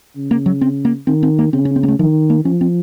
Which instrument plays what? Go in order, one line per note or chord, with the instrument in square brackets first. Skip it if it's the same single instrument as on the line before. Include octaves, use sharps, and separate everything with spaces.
[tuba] C#3
[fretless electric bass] A#3
F#3
C4
A#3
[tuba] D#3 [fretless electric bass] C4
[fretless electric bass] C4
A#3
[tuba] C#3 [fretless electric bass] C4
[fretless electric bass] C#4
C4
A#3
A3
[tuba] D#3 [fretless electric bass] F3
[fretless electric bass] A#3
[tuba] F3 [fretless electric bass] C#4
[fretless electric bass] C4